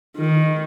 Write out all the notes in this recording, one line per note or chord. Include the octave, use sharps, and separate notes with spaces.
D#3